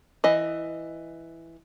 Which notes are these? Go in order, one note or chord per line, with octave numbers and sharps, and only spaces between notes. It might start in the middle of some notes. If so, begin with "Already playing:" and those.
E3 D#5